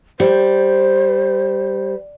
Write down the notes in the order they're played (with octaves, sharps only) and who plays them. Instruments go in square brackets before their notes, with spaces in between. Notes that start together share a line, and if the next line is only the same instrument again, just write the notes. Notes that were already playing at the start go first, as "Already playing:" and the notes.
[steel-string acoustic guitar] G3 [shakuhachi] C5